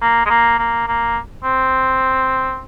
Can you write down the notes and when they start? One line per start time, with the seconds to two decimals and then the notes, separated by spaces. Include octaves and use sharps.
0.02 A#3
0.26 G#3
0.29 A#3
0.59 A#3
0.88 A#3
1.44 C4